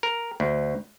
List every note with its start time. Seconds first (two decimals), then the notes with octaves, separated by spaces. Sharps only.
0.03 A#4
0.40 D2